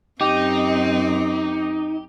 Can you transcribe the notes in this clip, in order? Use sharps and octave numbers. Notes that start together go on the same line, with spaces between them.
F#2 C4 D#4 G4